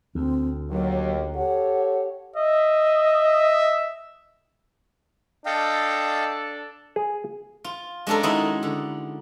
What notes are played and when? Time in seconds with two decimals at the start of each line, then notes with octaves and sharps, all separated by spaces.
0.15 D2 C4
0.70 D#2 F#3
1.35 G4 A4 C#5 F#5
2.36 D#5 E5
5.46 D4 A4 D#5 F5 G5
6.96 G#4
7.64 F4
8.07 G#3 C#4 D4 A4 A#4
8.23 D#3 G#3 D#4 E4 F#4
8.63 D3